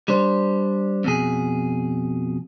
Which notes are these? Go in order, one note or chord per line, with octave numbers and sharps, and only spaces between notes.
G3 D4 C5
F2 B2 G#4